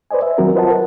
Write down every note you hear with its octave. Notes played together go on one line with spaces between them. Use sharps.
B4 C5 D5 D#5 G#5
E5
D#3 F#3 C4 F#4 A#4
F4 B4 C5 D#5 F#5 A5
A#4